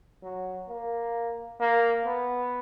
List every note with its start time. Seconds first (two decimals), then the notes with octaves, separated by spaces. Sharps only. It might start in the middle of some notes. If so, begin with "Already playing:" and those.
0.23 F#3
0.69 A#3
1.61 A#3
2.06 B3